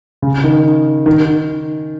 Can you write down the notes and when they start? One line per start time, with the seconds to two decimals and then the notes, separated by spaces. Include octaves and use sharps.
0.22 C#3
0.44 D#3
1.06 D#3